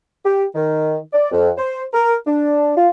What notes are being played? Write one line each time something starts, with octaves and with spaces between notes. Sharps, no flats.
G4
D#3
D5
F2
C5
A#4
D4
F4